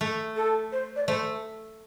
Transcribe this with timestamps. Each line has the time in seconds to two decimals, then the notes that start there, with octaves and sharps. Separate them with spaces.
0.01 A3
0.36 A4
0.72 C5
0.96 D5
1.08 A3 C5